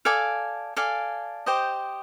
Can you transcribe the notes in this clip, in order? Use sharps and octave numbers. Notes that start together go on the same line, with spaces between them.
A4 D5 F5 G#5
A4 D5 F5 G#5
G4 C5 D#5